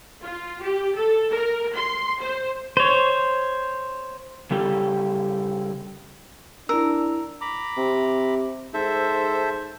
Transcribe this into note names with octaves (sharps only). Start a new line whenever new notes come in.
F4
G4
A4
A#4
C6
C5
C5 C#5
C#3 G3 G4 A4
D4 E4 A#4 E6
A#5 B5 D6
C3
G#2 A4 C5 E5